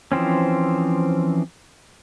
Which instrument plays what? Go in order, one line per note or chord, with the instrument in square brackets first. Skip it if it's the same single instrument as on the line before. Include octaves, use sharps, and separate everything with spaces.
[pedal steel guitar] E3 F3 C4 C#4